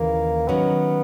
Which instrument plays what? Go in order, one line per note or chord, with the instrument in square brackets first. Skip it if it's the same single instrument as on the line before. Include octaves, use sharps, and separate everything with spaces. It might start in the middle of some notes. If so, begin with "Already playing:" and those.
Already playing: [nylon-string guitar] D#2 C#3 E3 [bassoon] A#3
[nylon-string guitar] D#3 F#3 C#4 [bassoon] B3